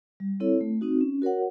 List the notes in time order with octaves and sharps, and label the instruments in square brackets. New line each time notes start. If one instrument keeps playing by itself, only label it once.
[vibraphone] G3
C4 E4 A4 C#5
A3
C4 D#4 F#4
C#4
F#4 A#4 C#5 F#5